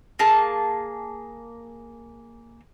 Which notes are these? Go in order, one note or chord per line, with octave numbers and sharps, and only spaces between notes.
A#3 G#4 A5